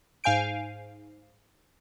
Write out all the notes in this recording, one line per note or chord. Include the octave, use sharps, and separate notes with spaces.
G#2 F5 G#5 G6 D7